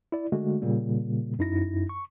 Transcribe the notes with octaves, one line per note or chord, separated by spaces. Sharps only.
E4 D5
D3 G#3 A3 F#4
A#2 C#3 G3 A#3
F#2 D#4 E4 A#6
C#6